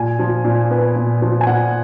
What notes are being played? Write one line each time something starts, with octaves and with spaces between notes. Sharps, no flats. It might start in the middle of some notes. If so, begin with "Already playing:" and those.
Already playing: A#2 G#5
F3
A#2
B3
A#2
F3
G#5
A#2 F#5